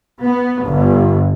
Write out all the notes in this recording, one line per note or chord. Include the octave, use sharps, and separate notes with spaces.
B3
G1